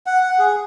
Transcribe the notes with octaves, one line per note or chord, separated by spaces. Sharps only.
F#5
F#5
G#4